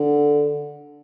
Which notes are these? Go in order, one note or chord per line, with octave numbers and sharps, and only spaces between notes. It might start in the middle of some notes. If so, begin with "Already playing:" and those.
Already playing: D3